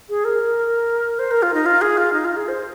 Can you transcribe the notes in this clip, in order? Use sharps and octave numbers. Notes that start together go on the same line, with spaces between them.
G#4
A#4
C5
A#4
F4
D#4
F4
G#4
F4
D#4
F4
G#4
C5